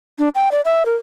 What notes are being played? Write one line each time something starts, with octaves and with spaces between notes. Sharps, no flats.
D4
G5
D5
E5
A#4